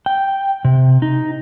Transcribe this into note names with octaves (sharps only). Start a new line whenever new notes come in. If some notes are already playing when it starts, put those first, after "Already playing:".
G5
C3
D#4